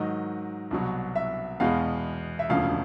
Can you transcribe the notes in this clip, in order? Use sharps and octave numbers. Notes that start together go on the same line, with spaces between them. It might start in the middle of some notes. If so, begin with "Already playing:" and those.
Already playing: G#2 D#3 F#3 D#5
C2 B2 F#3
E5
E2 B2 G#3 B3 F5
E5
E1 D2 C#3 F3 F5